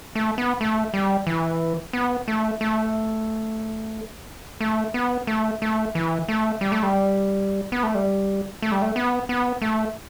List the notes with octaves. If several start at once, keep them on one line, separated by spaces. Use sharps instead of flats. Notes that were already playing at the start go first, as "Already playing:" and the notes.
A3
B3
A3
G3
E3
B3
A3
A3
A3
B3
A3
A3
E3
A3
G3
A3
G3
B3
A3
G3
A3
G3
A3
B3
B3
A3